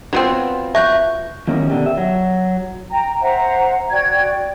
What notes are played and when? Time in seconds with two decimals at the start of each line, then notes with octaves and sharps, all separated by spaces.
0.13 F#3 B3 C4 F4 F#4 B4
0.75 E5 C#6 F#6 G6
1.47 E2 D#3 A#3 C#4 A#4
1.70 B2 D3 D4 G4
1.86 E5
1.98 F#3
2.92 G5 A#5
3.21 C5 E5 F#5 A#5
3.90 F#4 D5 G5 G#6